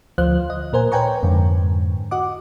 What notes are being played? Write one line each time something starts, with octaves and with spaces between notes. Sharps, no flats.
D2 F3 C5 F5 F#6
D#5
A#2 A#4 C5 G#5
B4 C#5 G5 G#5 A#5 C#6
F2 G#2 D3
F#4 D#5 F#5 D6